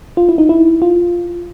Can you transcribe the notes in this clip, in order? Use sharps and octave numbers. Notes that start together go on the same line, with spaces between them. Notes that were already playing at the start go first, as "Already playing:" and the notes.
F4
E4
D#4
E4
F4